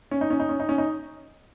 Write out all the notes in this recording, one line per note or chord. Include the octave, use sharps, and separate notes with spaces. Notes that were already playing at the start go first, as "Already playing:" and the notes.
C#4
D#4
C#4
D#4
C#4
D#4
C#4
D#4